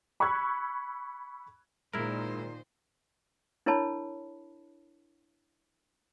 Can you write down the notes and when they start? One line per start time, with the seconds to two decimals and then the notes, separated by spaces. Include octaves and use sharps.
0.20 B5 C#6 E6 F#6 G#6
1.93 A#2 D#3 G#3 E4 A#4 C5
3.66 D4 E4 A#4 C#5 A5 B5